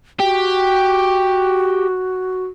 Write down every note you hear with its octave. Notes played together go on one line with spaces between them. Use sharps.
F#4 G4